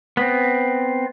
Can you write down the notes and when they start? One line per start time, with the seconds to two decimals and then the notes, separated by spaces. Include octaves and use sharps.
0.17 B3 C4